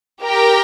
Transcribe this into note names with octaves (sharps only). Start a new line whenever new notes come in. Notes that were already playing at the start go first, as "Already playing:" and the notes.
G4 A#4 G5